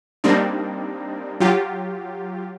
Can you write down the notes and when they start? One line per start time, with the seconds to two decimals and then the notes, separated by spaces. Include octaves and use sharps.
0.24 G3 A#3 C4 D4 D#4
1.40 F#3 F4 G4